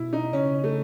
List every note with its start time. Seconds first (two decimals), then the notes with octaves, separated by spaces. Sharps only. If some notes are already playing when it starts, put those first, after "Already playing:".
Already playing: B2 E4
0.13 D#4
0.33 C#3 C#4
0.64 A3